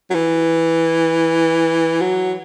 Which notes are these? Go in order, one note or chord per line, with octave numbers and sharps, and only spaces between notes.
F#3
E3
F#3